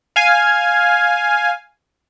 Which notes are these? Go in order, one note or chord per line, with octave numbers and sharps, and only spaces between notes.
F5 G#5